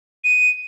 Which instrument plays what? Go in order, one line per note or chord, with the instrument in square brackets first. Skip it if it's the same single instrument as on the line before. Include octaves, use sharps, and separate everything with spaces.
[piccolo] D#7